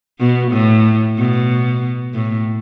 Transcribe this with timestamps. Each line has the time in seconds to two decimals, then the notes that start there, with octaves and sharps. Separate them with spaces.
0.20 B2
0.52 A2
1.18 B2
2.14 A2